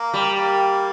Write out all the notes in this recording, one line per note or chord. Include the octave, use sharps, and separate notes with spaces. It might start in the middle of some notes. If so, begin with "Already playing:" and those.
Already playing: A#3
G3
A#3